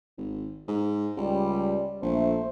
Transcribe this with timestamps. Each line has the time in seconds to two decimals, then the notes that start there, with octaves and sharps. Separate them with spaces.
0.18 G#1
0.68 G#2
1.17 C#2 G3
2.02 A#1 A3 C5